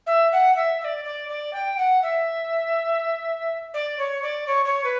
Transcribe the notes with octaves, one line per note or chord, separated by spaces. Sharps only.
E5
F#5
E5
E5
D5
D5
D5
G5
F#5
E5
D5
C#5
D5
C#5
C#5
B4